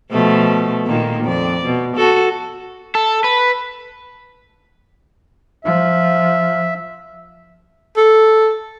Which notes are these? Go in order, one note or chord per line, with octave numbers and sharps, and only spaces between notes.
B2 F3 A3
A#2 D#3 A#3
F2 D5
B2
F#4 A4
A4
B4
F3 E5
A4